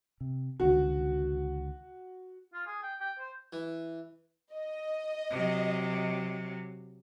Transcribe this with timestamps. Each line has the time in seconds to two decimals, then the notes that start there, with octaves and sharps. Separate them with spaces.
0.21 C3
0.60 C#2 D3 D#3 F#4
2.54 F4
2.66 G#4
2.83 G5
3.00 G5
3.19 C5
3.53 E3
4.53 D#5
5.31 C3 F#3